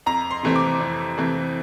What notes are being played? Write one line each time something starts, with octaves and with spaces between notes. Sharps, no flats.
F2 A#5
C6
C3 E3 A3 C4
D6
F2
C3 E3 A3 C4